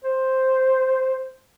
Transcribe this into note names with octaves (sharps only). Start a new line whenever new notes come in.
C5